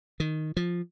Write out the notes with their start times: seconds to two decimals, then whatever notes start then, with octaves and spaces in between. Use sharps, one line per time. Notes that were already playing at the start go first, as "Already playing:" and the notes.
0.20 D#3
0.57 F3